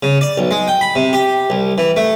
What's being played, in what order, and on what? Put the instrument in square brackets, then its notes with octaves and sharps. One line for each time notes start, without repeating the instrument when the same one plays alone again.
[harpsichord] C#3
D5
B1
G#3
G5
B5
C3
G4
C2
E3
A3